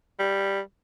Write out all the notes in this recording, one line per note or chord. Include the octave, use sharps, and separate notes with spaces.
G3